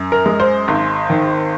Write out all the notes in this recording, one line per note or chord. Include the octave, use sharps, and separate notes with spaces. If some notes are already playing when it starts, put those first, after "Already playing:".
Already playing: F#2
A#4
G#3
C5
G#1
D#3